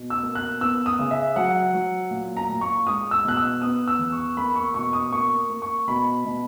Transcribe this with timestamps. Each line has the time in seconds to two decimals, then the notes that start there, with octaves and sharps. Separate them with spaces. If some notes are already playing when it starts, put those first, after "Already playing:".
Already playing: B2
0.10 E6
0.23 A#3
0.35 F#6
0.61 B3 E6
0.86 D#6
0.99 C#3
1.11 E5
1.36 F#3 F#5
1.74 F#3
2.11 A#2
2.37 A#5
2.49 A#2
2.61 C#6
2.87 G#3 D#6
3.11 E6
3.25 B2 F#6
3.37 E6
3.62 B3 D#6
3.88 E6
3.99 E2
4.12 C#6
4.37 A#3 B5
4.55 C#6
4.74 B2 C#6
4.93 D#6
5.12 A#3 C#6
5.50 A#3
5.62 C#6
5.87 B2 B5
6.25 B2